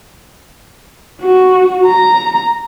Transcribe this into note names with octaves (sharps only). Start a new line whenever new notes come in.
F#4
A#5